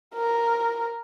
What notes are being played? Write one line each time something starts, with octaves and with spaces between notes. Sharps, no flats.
A#4